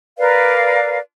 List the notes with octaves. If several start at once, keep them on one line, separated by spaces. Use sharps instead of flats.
A#4 B4 D5 F5